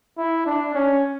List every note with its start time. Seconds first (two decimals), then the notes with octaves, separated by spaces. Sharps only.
0.18 E4
0.46 D4
0.75 C#4